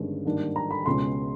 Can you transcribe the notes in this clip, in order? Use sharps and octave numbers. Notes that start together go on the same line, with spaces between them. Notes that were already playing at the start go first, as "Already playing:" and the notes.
Already playing: G1 G2 D#3 G#3 C#4
G#2 D#3 G3 A#3 D4
A#5
B5
C#2 B2 G#3 C#4 C6